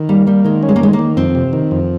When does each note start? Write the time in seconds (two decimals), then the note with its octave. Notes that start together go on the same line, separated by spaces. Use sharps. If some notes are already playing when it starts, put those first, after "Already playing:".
Already playing: D#3
0.09 G3 A#3
0.27 G3 A#3
0.45 D#3 G#3
0.63 C#4
0.69 G#3
0.76 A#3
0.81 D#3 G#3
0.93 A#3
0.99 D#3
1.17 F2 C4
1.35 C3
1.53 D#3
1.71 F2